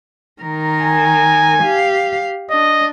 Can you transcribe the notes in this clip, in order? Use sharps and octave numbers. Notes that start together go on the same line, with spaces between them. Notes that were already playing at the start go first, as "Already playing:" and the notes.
D#3 A#4
G#5
G4 F5
D4 D#5